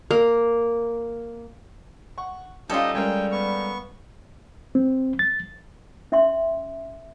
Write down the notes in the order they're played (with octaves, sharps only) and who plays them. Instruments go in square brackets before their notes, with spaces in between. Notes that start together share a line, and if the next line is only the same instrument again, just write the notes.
[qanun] A#3
[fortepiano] F#5 C#6
[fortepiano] G3 C#4 [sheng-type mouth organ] D#4 G4 D#5 [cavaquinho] F4 A4
[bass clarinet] G3 [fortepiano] G#3 C#4 A#4 [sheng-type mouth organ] G5
[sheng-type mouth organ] B3 C#6
[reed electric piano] C4
A6
[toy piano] C#4 E5 G5 C6